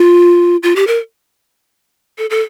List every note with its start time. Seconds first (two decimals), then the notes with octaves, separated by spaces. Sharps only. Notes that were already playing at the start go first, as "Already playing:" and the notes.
Already playing: F4
0.63 F4
0.76 G4
0.87 A#4
2.18 A4
2.30 A4